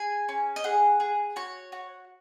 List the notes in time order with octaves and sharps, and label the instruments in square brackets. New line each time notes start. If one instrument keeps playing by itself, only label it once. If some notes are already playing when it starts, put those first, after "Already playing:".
Already playing: [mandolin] G#4 G#5
C#4
D#5
G#4 F#5
G#4
F#4 C#5
F#4